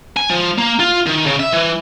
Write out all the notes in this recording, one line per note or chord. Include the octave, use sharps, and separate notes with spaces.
G#5
F3
A#3
F4
D#3
C#3
E5
E3